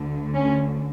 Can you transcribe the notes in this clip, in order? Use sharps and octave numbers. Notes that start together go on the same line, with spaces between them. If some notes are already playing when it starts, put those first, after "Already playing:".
Already playing: D2 D3
C#4